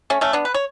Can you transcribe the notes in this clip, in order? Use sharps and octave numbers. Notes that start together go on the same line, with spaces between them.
A3 C#4
A3 C#4
B3 D4
B4
C#5